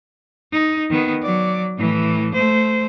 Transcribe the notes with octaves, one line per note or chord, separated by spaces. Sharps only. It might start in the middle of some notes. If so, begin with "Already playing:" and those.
D#4
D#3 B3
F#3 D5
A2 E3
A3 C5